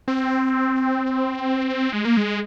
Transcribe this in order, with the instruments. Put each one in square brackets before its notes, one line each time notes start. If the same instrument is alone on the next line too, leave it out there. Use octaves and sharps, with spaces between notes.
[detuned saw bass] C4
G#3
A#3
G#3